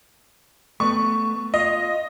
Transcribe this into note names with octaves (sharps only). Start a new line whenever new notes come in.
A3 B3 C#6
F4 D#5